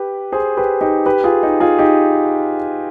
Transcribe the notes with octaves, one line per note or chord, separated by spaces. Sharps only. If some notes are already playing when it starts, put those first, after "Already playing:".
Already playing: G4 B4
G#4 C5
G4 B4
D#4 G4
G4 B4
F4 G#4
D#4 G4
F4 G#4
D#4 G4